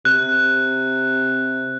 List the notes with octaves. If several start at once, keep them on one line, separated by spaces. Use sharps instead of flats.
C3 F#6